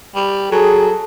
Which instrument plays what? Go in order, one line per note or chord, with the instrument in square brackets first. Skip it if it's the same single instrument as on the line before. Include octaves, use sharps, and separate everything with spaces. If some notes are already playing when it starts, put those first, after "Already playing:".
[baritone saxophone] G3
[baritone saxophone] F#3 [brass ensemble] G#4 [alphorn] A4